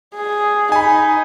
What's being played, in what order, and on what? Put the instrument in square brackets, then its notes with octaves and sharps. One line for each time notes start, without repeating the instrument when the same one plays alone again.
[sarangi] G#4
[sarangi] D#4 [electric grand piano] G#5 B5